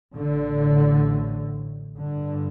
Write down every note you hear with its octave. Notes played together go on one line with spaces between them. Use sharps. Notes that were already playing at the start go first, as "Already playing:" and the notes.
A1 A2 D3
G1 G2 D3